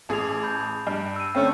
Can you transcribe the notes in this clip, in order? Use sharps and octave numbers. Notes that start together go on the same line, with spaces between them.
A1 G#4 A5 B6 F7
A5 B5 G6
G2 C7
E6 D#7
D3 A3 C4 C#4